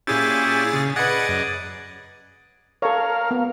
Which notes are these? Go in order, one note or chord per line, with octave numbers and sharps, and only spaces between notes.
A#2 C#4 E4 G4 G#4 A6
C#3
G#4 B4 D5 D#5 F#5
F#2
A4 A#4 C#5 F5
B3